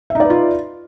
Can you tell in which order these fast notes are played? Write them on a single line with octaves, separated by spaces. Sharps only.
E5 D#4 D5 B4 F4